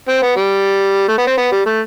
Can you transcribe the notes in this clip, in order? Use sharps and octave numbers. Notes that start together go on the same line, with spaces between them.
C4
B3
G3
A3
B3
C4
B3
G3
A3